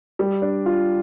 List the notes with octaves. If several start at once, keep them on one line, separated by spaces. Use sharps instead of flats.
G3
D4
F4